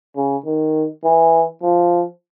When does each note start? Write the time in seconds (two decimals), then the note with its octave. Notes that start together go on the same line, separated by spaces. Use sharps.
0.16 C#3
0.45 D#3
1.04 E3
1.62 F3